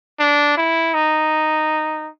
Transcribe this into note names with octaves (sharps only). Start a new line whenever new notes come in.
D4
E4
D#4